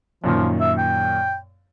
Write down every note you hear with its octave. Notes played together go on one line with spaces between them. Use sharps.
F#2 A#2 D#3 F3
E5
G5